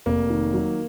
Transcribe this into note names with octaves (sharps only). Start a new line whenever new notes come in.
F1 A#3
D#3
F#3